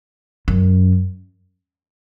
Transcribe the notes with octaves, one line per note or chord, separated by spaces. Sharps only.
F#2